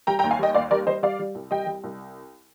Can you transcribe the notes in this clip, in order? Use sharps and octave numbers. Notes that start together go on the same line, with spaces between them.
G3 G5 A#5
G5 A#5
D#2
F5 G#5
G3 D#5 G5
D#2 D5 F5
G3 A#4 D5
G3 C5 D#5
G3 D5 F5
G3
C2
G3 D#5 G5
G3
C2